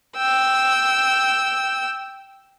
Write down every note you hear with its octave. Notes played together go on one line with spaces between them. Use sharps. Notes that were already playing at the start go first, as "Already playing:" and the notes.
G5 E6